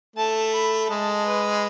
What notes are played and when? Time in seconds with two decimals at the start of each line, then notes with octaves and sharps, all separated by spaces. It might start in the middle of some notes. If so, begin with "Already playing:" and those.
0.16 A3 A5
0.53 B5
0.89 G#3 A5
1.26 B4